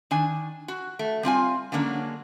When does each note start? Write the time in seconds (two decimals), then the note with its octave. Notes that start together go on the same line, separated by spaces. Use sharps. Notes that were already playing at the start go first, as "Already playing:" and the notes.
0.11 D#3 D4 G#5
0.68 F#4
0.99 A3
1.23 G3 C4 F4 G#5
1.72 D3 F#3 G#3 A#3 C#4 D4